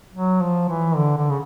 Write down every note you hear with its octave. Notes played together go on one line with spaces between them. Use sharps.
F#3
F3
E3
D3
D3
C#3